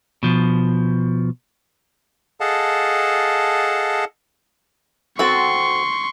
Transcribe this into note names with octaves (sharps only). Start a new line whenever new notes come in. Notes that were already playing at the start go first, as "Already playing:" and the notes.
B2 F3
G#4 A4 D#5 F5 F#5 A5
C4 F#4 A4 C6 C#6